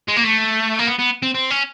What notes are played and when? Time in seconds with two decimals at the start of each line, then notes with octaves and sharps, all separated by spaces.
0.08 G#3
0.16 A#3
0.24 A3
0.79 A#3
0.87 B3
0.99 B3
1.22 C4
1.35 C4
1.51 C#4